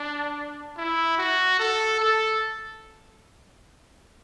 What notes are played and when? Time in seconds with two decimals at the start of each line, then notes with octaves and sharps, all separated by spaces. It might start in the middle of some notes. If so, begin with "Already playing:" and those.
Already playing: D4
0.77 E4
1.18 F#4
1.59 A4
2.00 A4